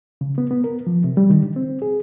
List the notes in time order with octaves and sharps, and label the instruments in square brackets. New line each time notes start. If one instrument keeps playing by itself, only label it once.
[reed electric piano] C#3
B3
B3
A#4
F3
C3
G3
D#3
D3
C4
G#4